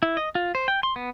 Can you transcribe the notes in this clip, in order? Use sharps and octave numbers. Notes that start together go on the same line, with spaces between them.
E4
D#5
F4
C5
G5
C6
B3